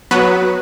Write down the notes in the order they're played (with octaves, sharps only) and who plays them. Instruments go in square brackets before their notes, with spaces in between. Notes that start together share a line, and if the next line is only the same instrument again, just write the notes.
[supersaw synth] F#3 B3 F#4 B4